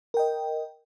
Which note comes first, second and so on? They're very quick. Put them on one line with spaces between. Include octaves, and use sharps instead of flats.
A#4 G5 D#5